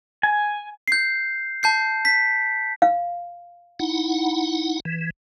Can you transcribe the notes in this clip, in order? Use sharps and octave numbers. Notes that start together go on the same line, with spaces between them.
G#5
G6 C7
A5 G6 C7
B6
F5
D#4 E4 F#5
E3